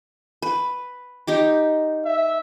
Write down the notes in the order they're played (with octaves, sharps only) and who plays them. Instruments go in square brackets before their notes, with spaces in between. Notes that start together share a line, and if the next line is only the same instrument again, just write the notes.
[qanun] B4
D#4 G4 D6
[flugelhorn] E5